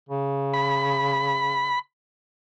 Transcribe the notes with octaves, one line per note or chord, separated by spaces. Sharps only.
C#3
B5